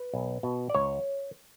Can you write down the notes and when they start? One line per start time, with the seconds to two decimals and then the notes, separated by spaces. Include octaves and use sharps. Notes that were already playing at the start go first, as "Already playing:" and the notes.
Already playing: B4
0.13 B1
0.43 B2
0.70 D5
0.74 C#2 C#5